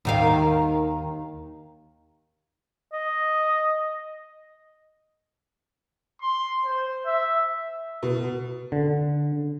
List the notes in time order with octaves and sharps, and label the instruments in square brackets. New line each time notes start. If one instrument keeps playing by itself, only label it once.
[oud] D#2 D#3 F5
[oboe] D#5
[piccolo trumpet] C6
C5
E5
[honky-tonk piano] B2
[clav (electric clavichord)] D3